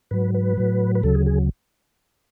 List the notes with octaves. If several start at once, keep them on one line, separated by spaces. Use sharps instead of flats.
G#2 F#3 B4
B4
A2 F#3
B4
D2 C#3 F#3 A4
G#4
G#4